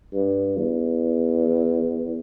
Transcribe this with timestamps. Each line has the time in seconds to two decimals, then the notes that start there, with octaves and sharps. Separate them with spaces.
0.14 G2
0.57 E2